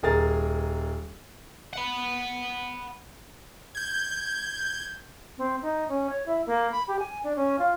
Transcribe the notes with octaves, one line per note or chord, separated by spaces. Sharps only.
D#1 G#4 A#4 A6
F#5 B5
G6 G#6
C4
D#4
C#4
C#5
E4
A#3
B5
G4
G#5
D4
C#4
F4